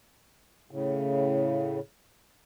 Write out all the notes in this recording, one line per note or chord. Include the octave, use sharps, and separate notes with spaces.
A2 C#3